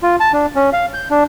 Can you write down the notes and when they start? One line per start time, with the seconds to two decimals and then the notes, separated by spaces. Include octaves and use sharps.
0.03 F4
0.20 A5
0.33 D4
0.55 C#4
0.73 F5
0.94 G6
1.10 D4